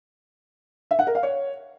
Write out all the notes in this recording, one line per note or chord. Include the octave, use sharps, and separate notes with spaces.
E5
F#5
A#4
F5
C#5